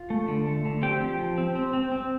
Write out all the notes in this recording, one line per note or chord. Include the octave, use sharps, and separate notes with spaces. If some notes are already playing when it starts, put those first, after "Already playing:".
Already playing: F4
A3
D3
A3
D3
C4 G4 G5
F3
F3
C4
C4
C4
C4